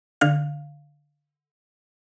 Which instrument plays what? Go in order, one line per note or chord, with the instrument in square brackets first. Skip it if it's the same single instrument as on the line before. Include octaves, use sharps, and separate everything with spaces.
[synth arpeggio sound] D3 F5